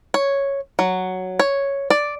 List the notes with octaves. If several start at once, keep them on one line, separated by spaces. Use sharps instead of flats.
C#5
F#3
C#5
D5